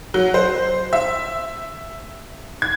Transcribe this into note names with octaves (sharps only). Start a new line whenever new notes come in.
F#3
C5
E5
G#6